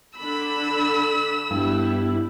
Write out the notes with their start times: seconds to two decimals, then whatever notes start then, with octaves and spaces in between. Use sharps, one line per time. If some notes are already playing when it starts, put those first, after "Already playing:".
0.18 D3 D4 B5 E6
1.51 G2 G3 B3 E4